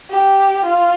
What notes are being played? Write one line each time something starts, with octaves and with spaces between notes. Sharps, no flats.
G4
F4